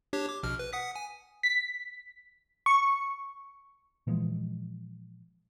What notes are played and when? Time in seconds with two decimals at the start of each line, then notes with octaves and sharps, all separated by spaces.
0.13 D4 G4 C#5
0.29 D6
0.43 A#1 B2 F6
0.59 B4
0.73 F#5 D#6 B6
0.96 G#5
1.43 B6
2.66 C#6
4.07 A#2 E3 F3 G#3